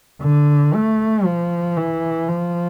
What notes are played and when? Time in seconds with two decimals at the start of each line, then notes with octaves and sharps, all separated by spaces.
0.21 D3
0.74 A3
1.25 F3
1.77 E3
2.29 F3